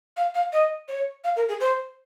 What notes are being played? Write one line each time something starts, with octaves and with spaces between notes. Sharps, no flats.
F5
F5
D#5
C#5
F5
A#4
G#4
C5